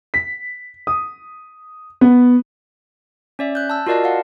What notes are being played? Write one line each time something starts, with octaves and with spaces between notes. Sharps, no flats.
B6
D#6
B3
C#4 D5 E5
F#6 G6
A5 E6
F4 F#4 A#4 D5 D#5 A5
F5 F#5